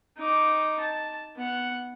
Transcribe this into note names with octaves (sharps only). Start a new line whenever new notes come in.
D#4 D6
A5
B3 F#5